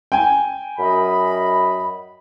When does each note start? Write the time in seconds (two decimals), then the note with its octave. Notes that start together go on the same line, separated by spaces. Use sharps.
0.12 G5 G#5
0.79 F#2 D#5 B5